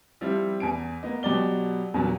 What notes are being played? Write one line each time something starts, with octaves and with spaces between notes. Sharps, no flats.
F3 G3 C4 E4
E2 G#5 D7
A#3 B3 D#5
B2 F#3 G4 D5 G7
E2 G2 A#2 F#3